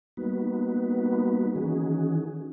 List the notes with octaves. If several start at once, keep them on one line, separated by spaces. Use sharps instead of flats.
G3 A#3 B3 D#4 F#4 B4
D#3 E3 C#4 D#4 F#4 G#4